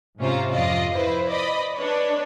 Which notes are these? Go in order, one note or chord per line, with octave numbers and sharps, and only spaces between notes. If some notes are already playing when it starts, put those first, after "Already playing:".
G#2 C3 C#4 F4 C5 A#5
F2 F4 D5 D#5
E4 B4 C5
D5 D#5 B5
D4 B4 C#5